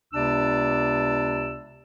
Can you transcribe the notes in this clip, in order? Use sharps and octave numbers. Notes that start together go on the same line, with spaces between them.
C#2 C3 B3 D4 D5 E6